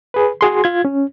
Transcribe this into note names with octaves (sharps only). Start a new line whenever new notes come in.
G#4 B4
F#4 G#4 C6
F4 G#6
C#4